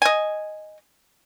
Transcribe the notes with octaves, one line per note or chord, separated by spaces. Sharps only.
D#5 G#5